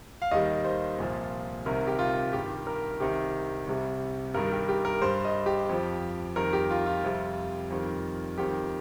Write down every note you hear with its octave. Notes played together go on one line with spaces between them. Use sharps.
F5
D#2 D#3 G3 D#5
C5
C2 A#2 F3
C2 C3 D#3 A#4
G4
F4
G2 D#3 G3 G4
A#4
C2 C3 D#3 G3 G4
C2 C3 G3
G2 D#3 G3 A#4
G4
G4
A#4
G2 G3 C5
D#5
G4
F2 F3
F2 D#3 G3 A#4
G4
F4
F4
F2 C3 G3
F2 D#3 G3
F2 D#3 G3 G4